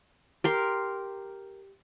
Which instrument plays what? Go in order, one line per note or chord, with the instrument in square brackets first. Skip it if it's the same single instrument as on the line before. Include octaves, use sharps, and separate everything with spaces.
[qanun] G4 A#4 C6